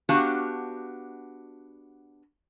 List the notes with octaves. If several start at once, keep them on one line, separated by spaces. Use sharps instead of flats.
B3 D4 F#4 G4 F5 A5